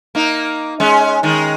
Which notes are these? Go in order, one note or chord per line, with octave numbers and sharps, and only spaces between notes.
A#3 D#4
G#3 C#4
D#3 G#3